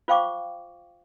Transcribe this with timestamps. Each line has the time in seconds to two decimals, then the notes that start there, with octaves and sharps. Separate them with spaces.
0.08 F4 C5 F5 G5 C#6 D6